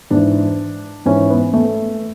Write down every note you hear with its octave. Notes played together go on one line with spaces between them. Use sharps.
G#2 E3 D4
G#2 E3 C#4
B3
A3